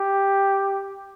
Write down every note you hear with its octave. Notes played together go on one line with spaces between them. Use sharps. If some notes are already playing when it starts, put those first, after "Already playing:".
Already playing: G4